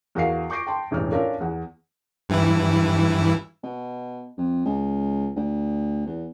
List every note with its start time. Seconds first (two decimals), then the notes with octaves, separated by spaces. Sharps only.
0.15 E2 F#4 A#4 F5 C7
0.50 C#6 D6 G6 A#6 C7 D7
0.67 G5 A5 C6
0.91 E1 A1 G2 F6
1.12 C#4 D4 F4 A4 A#4
1.40 E2 F#5
2.29 G2 E3 E4
3.64 B2
4.38 F2
4.65 C#2
5.37 D2
6.06 E2